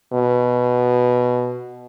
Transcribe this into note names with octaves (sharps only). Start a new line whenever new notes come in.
B2